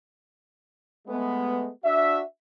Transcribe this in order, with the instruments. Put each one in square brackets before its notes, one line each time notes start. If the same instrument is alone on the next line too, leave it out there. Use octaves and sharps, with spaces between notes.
[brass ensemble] G#3 A3 B3
D4 F#4 E5